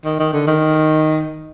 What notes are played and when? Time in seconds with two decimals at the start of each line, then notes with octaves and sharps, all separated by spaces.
0.05 D#3
0.19 D#3
0.33 D3
0.47 D#3